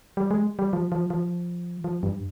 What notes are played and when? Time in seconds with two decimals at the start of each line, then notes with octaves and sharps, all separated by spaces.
0.17 G3
0.31 G#3
0.59 G3
0.73 F3
0.92 F3
1.10 F3
1.84 F3
2.03 G2